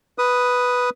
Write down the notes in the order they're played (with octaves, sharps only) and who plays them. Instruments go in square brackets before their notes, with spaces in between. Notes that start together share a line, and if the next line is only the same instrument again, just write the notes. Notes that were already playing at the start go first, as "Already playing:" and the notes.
[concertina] B4 D#6